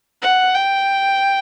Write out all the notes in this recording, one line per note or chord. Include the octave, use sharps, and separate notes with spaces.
F#5
G5